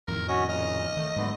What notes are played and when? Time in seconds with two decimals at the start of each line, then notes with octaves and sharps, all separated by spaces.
0.08 F2 A2 D#3 A#4
0.29 C#4 F#4 C#5 D#5
0.49 A#2 C#3 D#5 F6
0.97 D#3 A3
1.16 G#2 D3 F#3 A3 B3